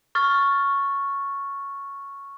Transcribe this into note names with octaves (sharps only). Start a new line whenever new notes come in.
C#6 F6 A6